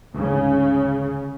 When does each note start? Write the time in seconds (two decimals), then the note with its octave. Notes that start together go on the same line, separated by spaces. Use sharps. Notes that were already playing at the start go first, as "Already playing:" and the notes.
0.15 D2 G#2 C#3